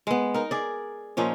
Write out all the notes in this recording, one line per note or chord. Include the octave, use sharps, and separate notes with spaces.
G#3 B3
D#4 A#4
G#4 D5
A#2 F3 C#4 D#4